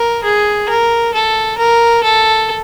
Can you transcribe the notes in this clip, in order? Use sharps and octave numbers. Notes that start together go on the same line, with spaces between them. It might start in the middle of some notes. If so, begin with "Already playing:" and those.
Already playing: A#4
G#4
A#4
A4
A#4
A4